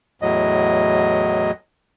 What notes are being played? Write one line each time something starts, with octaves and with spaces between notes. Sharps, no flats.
E2 A2 F#3 D#5